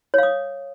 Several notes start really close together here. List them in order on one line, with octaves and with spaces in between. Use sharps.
C#5 F5 D#6